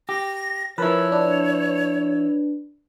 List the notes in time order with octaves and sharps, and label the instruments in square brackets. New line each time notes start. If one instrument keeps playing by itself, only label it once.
[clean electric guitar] G4 [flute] A#6
[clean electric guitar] F3 E4 [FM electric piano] A#4 B4 A5 [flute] C#5
[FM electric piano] D4 B4